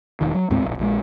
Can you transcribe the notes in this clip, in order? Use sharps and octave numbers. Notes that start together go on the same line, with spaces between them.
E1 D#3
F#3
D#2 A2 G#3 C4
D1 B1
A#1 E3 G#3